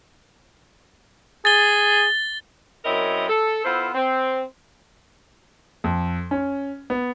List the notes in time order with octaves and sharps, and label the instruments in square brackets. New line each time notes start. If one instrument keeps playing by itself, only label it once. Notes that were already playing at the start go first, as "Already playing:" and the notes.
[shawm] G#4 [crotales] A6 G7
[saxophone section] F#2 C4 E4 A#4 C#5 D#5
A4
B3 E4 F4 A4 C5
C4
[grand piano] F2
C#4
B3